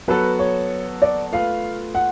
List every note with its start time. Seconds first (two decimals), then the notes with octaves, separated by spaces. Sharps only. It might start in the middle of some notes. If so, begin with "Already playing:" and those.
0.08 F#3 B3 F#4 A4 B4
0.39 C#5
1.02 D5
1.32 A3 F4 B4 F5
1.95 F#5